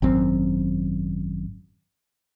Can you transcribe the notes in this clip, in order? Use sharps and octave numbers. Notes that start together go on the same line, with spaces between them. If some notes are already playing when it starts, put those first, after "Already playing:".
G#1 F#2 C4